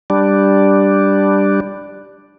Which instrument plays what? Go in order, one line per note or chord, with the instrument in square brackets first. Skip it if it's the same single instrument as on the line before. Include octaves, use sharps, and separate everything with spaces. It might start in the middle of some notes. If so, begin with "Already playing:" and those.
[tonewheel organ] G3 D4